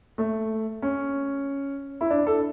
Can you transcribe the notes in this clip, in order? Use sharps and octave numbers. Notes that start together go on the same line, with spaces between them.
A3
C#4
E4
D4
A4